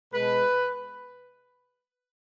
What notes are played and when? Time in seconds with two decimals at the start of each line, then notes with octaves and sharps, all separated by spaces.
0.13 B2 G#3 B4